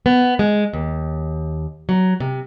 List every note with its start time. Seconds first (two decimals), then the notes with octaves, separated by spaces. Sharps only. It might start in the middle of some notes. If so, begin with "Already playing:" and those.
0.06 B3
0.39 G#3
0.73 D#2
1.89 F#3
2.20 C3